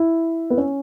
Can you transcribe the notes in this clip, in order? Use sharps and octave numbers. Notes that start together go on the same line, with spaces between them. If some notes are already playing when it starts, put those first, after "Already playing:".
Already playing: E4
B3
C#4